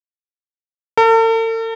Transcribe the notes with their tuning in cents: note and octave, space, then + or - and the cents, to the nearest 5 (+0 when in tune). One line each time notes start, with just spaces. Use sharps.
A4 +45